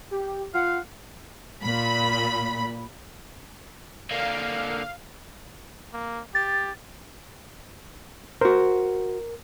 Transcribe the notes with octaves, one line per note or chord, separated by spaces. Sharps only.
G4
F4 F5 F#5
A#2 B5
D3 A#3 F5
A#3
G4 A6
F#4 A#4 C5